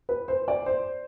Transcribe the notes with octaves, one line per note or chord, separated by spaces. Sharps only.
B4
C5
D5
C5